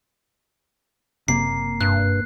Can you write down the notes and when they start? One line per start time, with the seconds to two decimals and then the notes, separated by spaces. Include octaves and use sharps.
1.28 F#1 C3 A#3 C7
1.81 G2 F#6